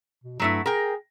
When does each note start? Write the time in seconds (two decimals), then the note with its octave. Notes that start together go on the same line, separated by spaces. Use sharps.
0.24 B2
0.40 G2 F#3 A3 E4
0.66 G#4 A#4 G5